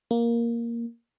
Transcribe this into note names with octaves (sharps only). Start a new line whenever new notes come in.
A#3